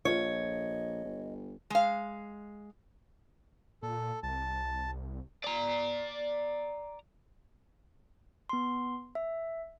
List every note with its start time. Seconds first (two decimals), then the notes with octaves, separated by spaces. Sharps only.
0.05 A#1 F4 A4 C#5 D#5
1.05 G1
1.70 G#3 F5
3.82 A#2 A4
4.23 C2 A5
5.44 D5 A#5
8.49 B3 C6
9.15 E5